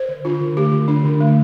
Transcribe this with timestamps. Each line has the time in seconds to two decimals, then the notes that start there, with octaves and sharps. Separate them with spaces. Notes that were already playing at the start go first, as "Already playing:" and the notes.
Already playing: C5
0.09 D3
0.25 D4 F4
0.40 D3
0.57 A3 G4
0.72 D3
0.88 D4
1.05 D3
1.20 A3